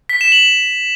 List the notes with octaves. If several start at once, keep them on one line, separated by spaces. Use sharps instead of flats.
B6
E7
F#7